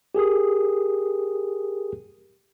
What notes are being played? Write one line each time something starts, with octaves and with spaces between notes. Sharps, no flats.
G4 G#4 A#4 D#6